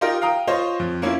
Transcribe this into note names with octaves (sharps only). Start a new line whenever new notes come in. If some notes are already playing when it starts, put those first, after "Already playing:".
D#4 F4 G4 A#4 D#5
F5 G5 A#5 D#6
F4 C5 C#5 D#5
F2
A#3 C#4 E4 F4